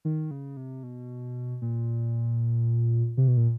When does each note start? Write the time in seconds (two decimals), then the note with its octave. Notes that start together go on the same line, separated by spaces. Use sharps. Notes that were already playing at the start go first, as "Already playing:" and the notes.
0.05 D#3
0.31 C#3
0.57 C3
0.83 B2
1.62 A#2
3.17 C3
3.28 B2
3.37 A#2